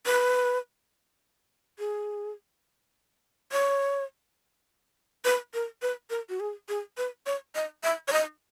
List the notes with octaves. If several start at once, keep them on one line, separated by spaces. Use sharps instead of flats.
B4
G#4
C#5
B4
A#4
B4
A#4
F#4
G#4
G#4
B4
C#5
D#5
E5
C#5
D#5